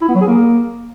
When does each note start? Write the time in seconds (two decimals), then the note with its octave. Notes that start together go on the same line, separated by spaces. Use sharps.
0.02 E4
0.08 B3
0.15 F#3
0.21 G#4
0.27 A#3